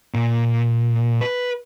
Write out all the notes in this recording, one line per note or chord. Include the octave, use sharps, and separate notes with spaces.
A#2
B4